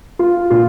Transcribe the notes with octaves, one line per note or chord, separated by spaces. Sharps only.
F4
A#2 F4